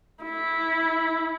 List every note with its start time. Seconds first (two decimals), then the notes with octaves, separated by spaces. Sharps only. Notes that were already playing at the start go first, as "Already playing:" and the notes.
0.24 E4